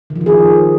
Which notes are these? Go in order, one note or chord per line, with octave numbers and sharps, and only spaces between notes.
D#3
F3
D#3
G#4